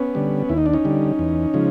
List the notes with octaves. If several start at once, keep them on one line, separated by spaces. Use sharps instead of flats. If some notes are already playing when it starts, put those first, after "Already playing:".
Already playing: B3 C#4
D3 G3
D#2 E4
D#4
D4
C#4 D#4
D3 G3
E2
C#3 F3 G#3